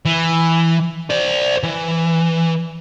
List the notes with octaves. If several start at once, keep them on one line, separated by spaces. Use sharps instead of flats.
E3
C5 D5
E3